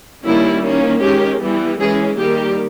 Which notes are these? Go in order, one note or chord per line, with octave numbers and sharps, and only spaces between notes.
D#3 G3 A#3 C#4 E4
D#3 A#3 C#4
D#3 G#3 C#4 G4
E3 G3 B3
E3 G#3 C#4 G#4
D#3 G3 A#3 G4